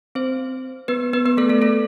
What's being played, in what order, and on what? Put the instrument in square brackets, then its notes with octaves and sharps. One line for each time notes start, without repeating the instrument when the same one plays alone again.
[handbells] C4 C5
B3 B4
B3 B4
B3 B4
A3 A4
A3 A4
A3 A4